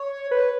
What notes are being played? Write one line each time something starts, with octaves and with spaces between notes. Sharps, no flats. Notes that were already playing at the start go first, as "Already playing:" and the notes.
Already playing: C#5
B4